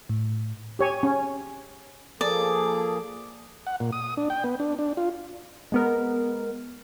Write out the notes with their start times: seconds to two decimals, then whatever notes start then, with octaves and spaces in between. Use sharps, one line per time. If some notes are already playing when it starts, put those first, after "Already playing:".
0.09 A2
0.79 G4 C#5 G#5
1.03 C#4
2.21 F3 A#3 G#4 A4 D5
3.67 F#5
3.80 A#2
3.92 D#6
4.17 D4
4.30 G5
4.44 B3
4.60 D4
4.79 D4
4.97 F4
5.72 G#3 B3 A#4